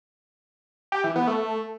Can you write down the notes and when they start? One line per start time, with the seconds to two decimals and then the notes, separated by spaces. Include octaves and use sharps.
0.92 G4
1.04 E3
1.16 B3
1.27 A3